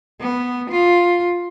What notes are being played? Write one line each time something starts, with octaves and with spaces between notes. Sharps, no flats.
B3
F4